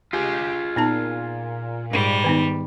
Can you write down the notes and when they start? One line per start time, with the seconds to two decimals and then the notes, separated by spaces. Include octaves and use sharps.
0.13 F4 G4 G#4
0.76 A#2 B3 D#4 A5
1.90 G#2 G3
2.24 D#3 B3 D#4